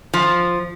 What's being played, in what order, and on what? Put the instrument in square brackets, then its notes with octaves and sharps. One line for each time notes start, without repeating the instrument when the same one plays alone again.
[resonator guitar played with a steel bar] F3